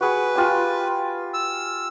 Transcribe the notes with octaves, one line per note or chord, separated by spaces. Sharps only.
F#4 G#4 B4
F4 G4 G#5
E6